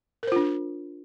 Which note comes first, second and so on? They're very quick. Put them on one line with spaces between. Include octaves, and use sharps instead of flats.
A#4 C5 F4 D4